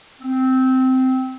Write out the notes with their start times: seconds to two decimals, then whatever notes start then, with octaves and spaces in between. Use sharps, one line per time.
0.20 C4